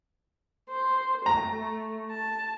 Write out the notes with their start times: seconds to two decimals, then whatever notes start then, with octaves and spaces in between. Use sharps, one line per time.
0.70 C5
1.26 A3 A#5
2.11 A5